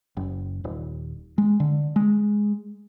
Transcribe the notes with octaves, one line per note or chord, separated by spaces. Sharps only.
F#1
D#1
G#3
D3
G#3